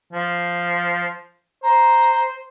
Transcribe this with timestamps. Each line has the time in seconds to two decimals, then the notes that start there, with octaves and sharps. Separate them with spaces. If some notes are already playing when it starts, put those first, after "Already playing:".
0.13 F3
1.63 C5 A#5